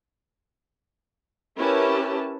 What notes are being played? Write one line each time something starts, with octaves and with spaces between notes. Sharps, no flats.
C#4 E4 G4 A#4 B4 A5